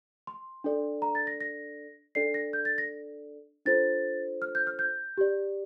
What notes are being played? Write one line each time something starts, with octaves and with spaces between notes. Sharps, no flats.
C6
D4 A4 D5
A#5
A6
A#6
A#6
D4 A4 D5 C7
A#6
G6
A6
A#6
D4 F4 A4 C5 A6
F6
G6
F6
G6
G4 D5